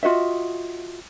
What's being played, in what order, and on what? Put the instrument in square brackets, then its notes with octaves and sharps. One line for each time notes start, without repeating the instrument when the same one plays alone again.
[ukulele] F4 F#4 D#5 E5